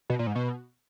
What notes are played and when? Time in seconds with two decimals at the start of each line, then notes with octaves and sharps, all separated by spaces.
0.10 B2
0.19 A#2
0.27 G#2
0.35 B2